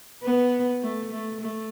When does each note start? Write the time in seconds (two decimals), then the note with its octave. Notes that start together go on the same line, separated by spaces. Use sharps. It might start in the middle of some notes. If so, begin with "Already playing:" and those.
0.23 B3
0.83 A3
1.12 A3
1.41 A3